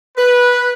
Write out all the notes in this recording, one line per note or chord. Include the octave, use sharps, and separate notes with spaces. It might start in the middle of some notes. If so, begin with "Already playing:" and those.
B4